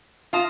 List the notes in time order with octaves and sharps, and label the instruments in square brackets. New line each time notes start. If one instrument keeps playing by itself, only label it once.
[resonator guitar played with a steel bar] F4 [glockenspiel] A5 D#6 A#6